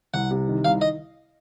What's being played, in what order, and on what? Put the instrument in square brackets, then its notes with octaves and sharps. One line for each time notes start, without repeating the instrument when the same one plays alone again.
[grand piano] C2 [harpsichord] F#5
[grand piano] C3
D#3
[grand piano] C2 [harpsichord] F5
[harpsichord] D#5